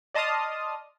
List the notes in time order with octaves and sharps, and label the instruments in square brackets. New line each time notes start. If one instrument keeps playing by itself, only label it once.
[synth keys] D5 D#5 A5 C6 D#6 F6